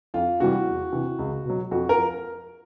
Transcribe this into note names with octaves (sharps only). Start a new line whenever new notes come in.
F2 F4
C3 E3 G3 F#4
E2
C3 E3
C#2
B2 F#3
F2 F#4
A#4
F3